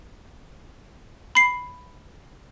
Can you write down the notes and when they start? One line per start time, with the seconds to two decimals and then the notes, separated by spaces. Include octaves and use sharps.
1.35 B5 C7